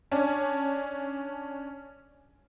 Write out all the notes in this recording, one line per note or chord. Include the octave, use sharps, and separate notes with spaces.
C#4 D4